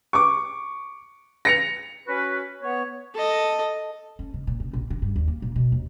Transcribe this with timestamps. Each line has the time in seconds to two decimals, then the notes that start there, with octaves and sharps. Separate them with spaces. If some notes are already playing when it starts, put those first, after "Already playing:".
0.13 C#6 D6
1.45 A#6 C#7 F7
2.07 C#4 F#4 B4
2.62 B3 C#5
3.14 A4 D#5
4.19 C#4
4.34 C#3
4.47 A#2
4.60 C#3
4.73 A#1
4.90 D3
5.02 G2
5.16 D#2
5.28 A#3
5.42 A#2
5.56 B2
5.72 D#2